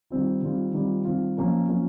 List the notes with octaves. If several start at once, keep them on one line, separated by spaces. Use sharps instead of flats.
D#3 G3 C4 F4
D#3 G3 C4 F4
D#3 G3 C4 F4
D#3 G3 C4 F4
F3 A#3 C#4 F4 A#4
F3 A#3 C#4 F4 A#4